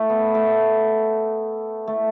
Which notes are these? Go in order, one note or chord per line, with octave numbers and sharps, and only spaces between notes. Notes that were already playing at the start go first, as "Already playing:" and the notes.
Already playing: A3
B3
A3
A3